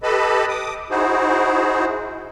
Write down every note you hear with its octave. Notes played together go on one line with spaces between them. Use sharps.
G4 A4 B4 D#5 A5 B5
D6 D#6
D#4 E4 F#4 G#4 C5